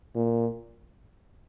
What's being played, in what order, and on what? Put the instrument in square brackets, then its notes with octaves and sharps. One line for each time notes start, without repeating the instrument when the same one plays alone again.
[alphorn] A#2